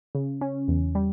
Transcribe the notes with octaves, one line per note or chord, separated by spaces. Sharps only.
C#3
C#4
E2
G3